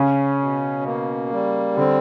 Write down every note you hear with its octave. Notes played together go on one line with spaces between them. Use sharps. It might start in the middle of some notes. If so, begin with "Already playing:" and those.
Already playing: C#3 C#4
B2
A#3
G3
D3 C4